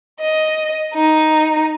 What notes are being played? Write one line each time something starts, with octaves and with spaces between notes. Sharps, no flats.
D#5
D#4